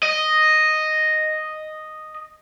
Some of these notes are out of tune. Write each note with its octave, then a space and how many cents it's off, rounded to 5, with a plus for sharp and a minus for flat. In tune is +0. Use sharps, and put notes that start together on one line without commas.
D#5 -5